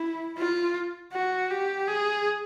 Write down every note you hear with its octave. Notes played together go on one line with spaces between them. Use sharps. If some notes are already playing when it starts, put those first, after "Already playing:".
Already playing: E4
F4
F#4
G4
G#4